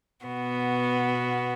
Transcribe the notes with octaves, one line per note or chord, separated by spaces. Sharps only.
B2 B3 F#4